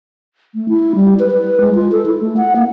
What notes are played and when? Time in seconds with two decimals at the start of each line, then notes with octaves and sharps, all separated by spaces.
0.55 A3
0.69 E4
0.95 G3
1.19 B4
1.32 B4
1.60 G#3
1.75 F4
1.92 A4
2.06 E4
2.21 A3
2.37 F#5
2.56 A#3